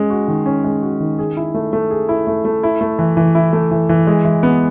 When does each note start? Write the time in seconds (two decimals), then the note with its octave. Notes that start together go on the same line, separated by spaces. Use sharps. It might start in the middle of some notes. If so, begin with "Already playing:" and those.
Already playing: G#3 C#4
0.10 F#4
0.28 D#3
0.46 C#4
0.64 G#3
0.82 F#4
1.00 D#3
1.19 G#4
1.37 E4
1.54 A3
1.73 A3
1.90 G#4
2.09 E4
2.27 A3
2.45 A3
2.63 E4
2.81 A3
2.99 E3
3.17 E3
3.35 E4
3.53 A3
3.71 E3
3.89 E3
4.07 G#3
4.25 E3
4.43 B3